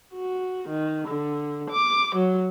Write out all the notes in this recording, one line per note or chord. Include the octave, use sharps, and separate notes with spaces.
F#4
D#3
D3
D6
F#3